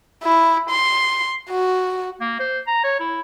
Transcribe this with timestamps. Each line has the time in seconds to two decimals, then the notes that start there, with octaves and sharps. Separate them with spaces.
0.23 E4
0.70 C6
1.50 F#4
2.20 A#3
2.40 C5
2.67 A#5
2.84 C#5
3.00 E4